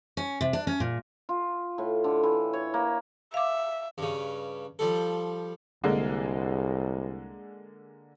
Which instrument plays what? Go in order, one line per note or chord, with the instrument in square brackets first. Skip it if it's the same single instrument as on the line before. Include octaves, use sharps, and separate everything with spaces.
[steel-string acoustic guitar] C#4
C3
D4
C#4
A#2
[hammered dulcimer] F4
A2
D3
E3
C#5
A#3
[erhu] E5 [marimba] F5 D6
[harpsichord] G2 C#3
F3 G3 A4
[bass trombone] C2 [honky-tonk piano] D3 G#3 A#3